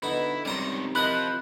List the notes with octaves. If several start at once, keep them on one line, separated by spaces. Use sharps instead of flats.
B2 D3 D#4 E4
C#2 C3 D#3 G3 A#5 C6
F3 E4 A#4 D#5 B5 F#6